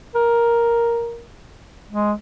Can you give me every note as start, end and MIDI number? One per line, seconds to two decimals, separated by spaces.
0.15 1.23 70
1.91 2.13 56